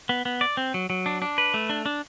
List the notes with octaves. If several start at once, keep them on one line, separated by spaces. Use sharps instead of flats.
B3
B3
D5
C4
F#3
F#3
D4
D4
B4
A3
D4
D4